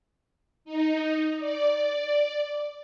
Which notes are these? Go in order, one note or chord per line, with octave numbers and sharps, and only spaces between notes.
D#4
D5